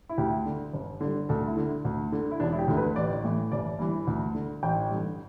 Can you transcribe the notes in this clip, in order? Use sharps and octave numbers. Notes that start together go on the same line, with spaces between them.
E4
D2 G4
D3
G1
G2 D3
D2 A4
E4
D3
D2
D3
E4
E1 D4
E4
G4
D2 D3
B4
A1 D5
A2 E3
G1 D5
G2 E3
D2
D3
A1 G5
G2 D3